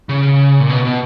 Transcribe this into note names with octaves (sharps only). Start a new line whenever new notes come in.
C#3
A#2
B2
B2